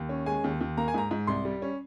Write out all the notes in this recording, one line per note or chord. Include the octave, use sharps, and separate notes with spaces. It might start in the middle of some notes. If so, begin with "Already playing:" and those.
Already playing: D#2
C#4
G#3 G#5
D#2
D#2
A#3 A#5
G#5
G#2 A#5
G#2
C2 C6
G3
C#4